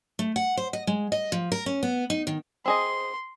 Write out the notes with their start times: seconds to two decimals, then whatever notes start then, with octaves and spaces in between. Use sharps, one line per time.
0.19 A3
0.36 F#5
0.57 C5
0.73 D#5
0.87 G#3
1.12 D#5
1.32 F3
1.52 A#4
1.66 C#4
1.83 B3
2.10 D#4
2.27 D#3
2.66 C4 G#4 D#5 C6